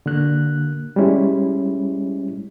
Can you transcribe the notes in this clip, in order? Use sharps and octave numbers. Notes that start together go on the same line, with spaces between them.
D3 A#3 F#6
G3 G#3 C#4 E4